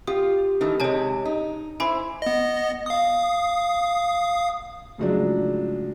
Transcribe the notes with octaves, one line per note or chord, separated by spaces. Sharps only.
F4 G4 D#6
D#3 E3 A3
C3 G#3 C#5 G#5 A5
D#4
E4 C5 G#5 B5 D6
B3 D#5
F5 D#6
A2 C#3 F3 F#3 G#3 D4